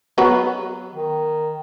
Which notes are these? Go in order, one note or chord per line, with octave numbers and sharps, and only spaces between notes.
F#3 B3 B4
D#3